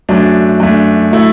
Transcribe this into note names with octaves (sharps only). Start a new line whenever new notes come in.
F#2 F#3 A3 D4
F#2 F#3 A3 D4
F#3 A3 E4